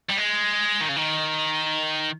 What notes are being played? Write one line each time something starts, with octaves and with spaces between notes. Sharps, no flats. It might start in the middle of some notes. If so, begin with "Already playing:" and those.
G3
G#3
D#3
C#3
D#3